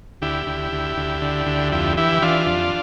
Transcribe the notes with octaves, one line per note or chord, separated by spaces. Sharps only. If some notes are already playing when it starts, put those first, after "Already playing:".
D2 E4 G4
D2
D2
D2
D3
D2
F2 E4 G4
E3 E4 G4
E3 D4 F4
F2